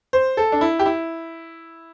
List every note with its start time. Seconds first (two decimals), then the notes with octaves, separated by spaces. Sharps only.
0.13 C5
0.37 A4
0.52 D4
0.61 E4
0.79 G4
0.86 E4